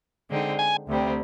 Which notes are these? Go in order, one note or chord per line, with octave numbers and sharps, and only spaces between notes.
D3 G#3 C4 D#4
G#5
D2 C3 G3 C4